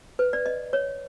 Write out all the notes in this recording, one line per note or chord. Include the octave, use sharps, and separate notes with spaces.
B4
D5
D#5
C#5